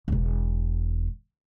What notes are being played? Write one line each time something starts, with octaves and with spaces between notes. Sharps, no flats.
E1 B2